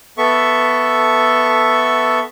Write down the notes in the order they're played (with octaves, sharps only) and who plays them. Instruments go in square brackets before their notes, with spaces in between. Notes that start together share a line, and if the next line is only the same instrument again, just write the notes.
[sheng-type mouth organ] B3 A4 E5 C#6